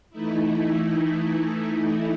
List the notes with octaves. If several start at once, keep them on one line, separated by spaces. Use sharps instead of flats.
E3 A3 D#4 E4